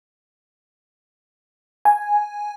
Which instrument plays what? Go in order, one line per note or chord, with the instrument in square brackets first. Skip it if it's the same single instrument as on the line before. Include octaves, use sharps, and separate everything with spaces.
[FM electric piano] G#5